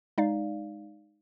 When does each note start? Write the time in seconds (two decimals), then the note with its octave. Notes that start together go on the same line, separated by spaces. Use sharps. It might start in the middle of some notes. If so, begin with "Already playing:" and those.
0.18 G#3 D#4 D5 F5